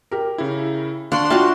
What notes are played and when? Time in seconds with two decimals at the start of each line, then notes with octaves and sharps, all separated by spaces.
0.11 G4 A#4
0.38 C#3 E4
1.12 D4 F5 F#5 C6 C#6
1.30 F4 F#4 E5 G5 A5 F6